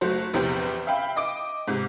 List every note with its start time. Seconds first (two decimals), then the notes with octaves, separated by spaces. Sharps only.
0.01 F#1 F#3 A3 C5
0.34 A#1 E2 C3 E3 G4 C5
0.87 E5 F5 G5 B5
1.16 D#5 D6 D7
1.67 G#2 C3